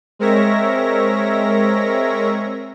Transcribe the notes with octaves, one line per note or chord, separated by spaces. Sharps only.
G#3 C4 A#4 C#5 E5 A#6